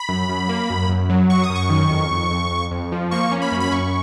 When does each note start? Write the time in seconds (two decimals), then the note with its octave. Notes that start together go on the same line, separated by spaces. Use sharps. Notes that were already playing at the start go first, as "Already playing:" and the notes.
Already playing: B5
0.09 F#2
0.29 F#2
0.49 A#3
0.70 F#2
0.89 F#2
1.10 F#3
1.30 F#2 C#6
1.44 D#6
1.50 F#2
1.56 C#6
1.70 D#3
1.90 F2
2.11 F2
2.31 F2
2.51 F2
2.71 F2
2.92 F3
3.11 A#3 C#6
3.32 C#4
3.42 B5
3.52 F#2
3.60 B5
3.72 F#2 C#6